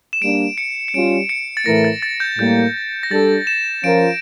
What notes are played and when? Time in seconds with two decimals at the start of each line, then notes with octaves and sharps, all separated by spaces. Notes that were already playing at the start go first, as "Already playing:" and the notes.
0.13 E7
0.22 G3 A#3 D4 D7
0.58 C#7
0.88 C#7
0.94 G3 C#4 F4 D7
1.29 C#7
1.57 A6
1.66 A2 E3 A3 E4 A#4 A#6
1.84 A6
2.03 A6
2.20 G6
2.38 A2 G3 A#3 G6
3.03 A#6
3.10 G3 D4 A4 A6
3.47 E7
3.83 F3 C#4 F4 A#4 D7